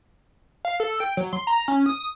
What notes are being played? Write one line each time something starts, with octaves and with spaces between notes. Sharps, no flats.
F5
A4
G5
F#3
C6
A#5
C#4
D#6